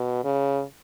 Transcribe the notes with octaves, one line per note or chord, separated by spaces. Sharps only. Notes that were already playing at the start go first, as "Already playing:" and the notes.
Already playing: B2
C#3